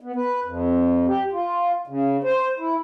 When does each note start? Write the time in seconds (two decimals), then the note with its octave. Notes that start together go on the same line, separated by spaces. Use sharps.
0.01 B3
0.16 B4
0.45 F2
1.07 G4
1.32 F4
1.87 C#3
2.24 C5
2.59 E4